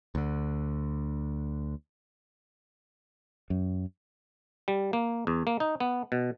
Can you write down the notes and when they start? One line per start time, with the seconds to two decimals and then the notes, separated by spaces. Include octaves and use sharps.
0.15 D2 D3
3.50 F#2
4.68 G3
4.93 A#3
5.27 E2
5.47 A#3
5.60 D#4
5.80 B3
6.12 B2